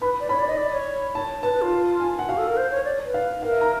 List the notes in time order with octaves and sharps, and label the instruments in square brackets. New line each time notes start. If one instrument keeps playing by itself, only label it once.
[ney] B4 [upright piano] B5
[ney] D5
[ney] C#5 [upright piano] B5
[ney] D5
D#5
D5
C#5
[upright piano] A5
[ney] B4 [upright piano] A5
[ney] B4
F4
[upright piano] G#5
F#5
[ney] F#4 [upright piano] F5
[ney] A4
A#4
C5
C#5
D5
B4
[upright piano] F5
[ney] A#4 [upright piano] F5
[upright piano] E5
A#5